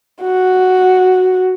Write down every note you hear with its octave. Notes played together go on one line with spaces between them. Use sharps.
F#4